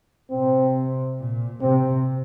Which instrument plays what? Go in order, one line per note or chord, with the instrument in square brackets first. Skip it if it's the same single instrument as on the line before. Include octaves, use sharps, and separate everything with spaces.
[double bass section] C3 [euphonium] C4
[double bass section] A#2
[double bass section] C3 [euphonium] C4